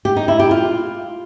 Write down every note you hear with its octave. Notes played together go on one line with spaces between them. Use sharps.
G4
D#4
E4
G4
F4